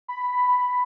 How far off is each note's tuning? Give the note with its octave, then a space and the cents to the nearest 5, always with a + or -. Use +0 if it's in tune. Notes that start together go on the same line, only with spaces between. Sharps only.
B5 +5